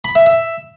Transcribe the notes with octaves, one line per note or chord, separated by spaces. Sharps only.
B5
E5
E5